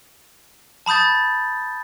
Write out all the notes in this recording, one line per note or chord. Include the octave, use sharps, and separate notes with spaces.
A5 B5 D#6 G6 A6